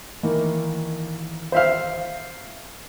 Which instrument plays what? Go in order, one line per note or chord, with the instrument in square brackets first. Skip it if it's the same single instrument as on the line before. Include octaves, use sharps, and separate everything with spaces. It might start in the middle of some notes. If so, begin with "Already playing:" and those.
[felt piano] D#3 E3 A#3
[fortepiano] C5 E5 F5